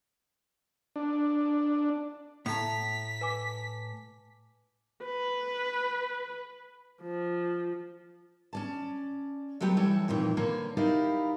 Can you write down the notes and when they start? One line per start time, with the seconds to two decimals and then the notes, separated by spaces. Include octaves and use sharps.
0.96 D4
2.46 A2 A5 A#5 B6
3.21 B4 G#5 D6
5.05 B4
7.02 F3
8.53 C#4 D5 A5
9.61 C3 F#3 A3 B3 G4 A4
9.77 E3 G3 A4 C#5 G5
10.08 F2 A#2 D#3 E3
10.37 D3 A#3 B4 C#5 D5
10.77 D#4 E4 G4 A#4 D5 F5